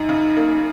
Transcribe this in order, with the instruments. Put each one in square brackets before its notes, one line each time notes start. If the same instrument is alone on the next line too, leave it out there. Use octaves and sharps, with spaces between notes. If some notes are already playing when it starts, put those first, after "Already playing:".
Already playing: [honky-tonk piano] F#2 [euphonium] D#4
[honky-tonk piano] C#3
A#3